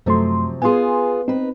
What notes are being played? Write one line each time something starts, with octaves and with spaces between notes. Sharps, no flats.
F#2 C3 F3 F#3 A3 C6
B3 F4 G#4 G#5 C6
C4 D#4 B4